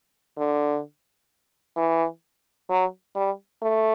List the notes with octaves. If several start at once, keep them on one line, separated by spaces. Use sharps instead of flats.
D3
E3
F#3
G3
A3